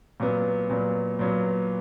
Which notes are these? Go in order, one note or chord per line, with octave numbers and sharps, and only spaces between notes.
A#2 F#3 B3
A#2 F#3 B3
A#2 F#3 B3